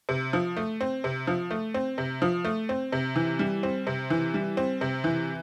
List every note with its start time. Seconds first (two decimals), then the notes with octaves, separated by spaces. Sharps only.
0.09 C3
0.33 F3
0.57 A3
0.81 C4
1.04 C3
1.27 F3
1.51 A3
1.74 C4
1.98 C3
2.22 F3
2.45 A3
2.69 C4
2.92 C3
3.16 E3
3.39 G3
3.63 C4
3.87 C3
4.10 E3
4.34 G3
4.57 C4
4.81 C3
5.04 E3